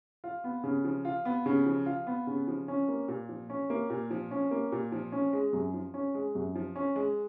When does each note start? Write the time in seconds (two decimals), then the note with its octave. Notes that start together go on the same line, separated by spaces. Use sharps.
0.24 F4
0.44 B3
0.64 C#3
0.85 F3
1.05 F4
1.25 B3
1.46 C#3
1.66 F3
1.86 F4
2.07 B3
2.27 C#3
2.48 F3
2.68 C#4
2.89 A#3
3.08 A#2
3.29 F3
3.50 C#4
3.70 A#3
3.90 A#2
4.11 F3
4.31 C#4
4.51 A#3
4.72 A#2
4.92 F3
5.12 C#4
5.33 G#3
5.53 F#2
5.74 F3
5.94 C#4
6.14 G#3
6.35 F#2
6.55 F3
6.76 C#4
6.96 G#3